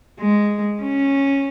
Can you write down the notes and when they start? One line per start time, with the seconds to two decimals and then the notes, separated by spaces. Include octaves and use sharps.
0.20 G#3
0.82 C#4